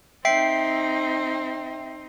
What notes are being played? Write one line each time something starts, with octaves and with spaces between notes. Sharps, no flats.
C4 D#4 E5 G5 C7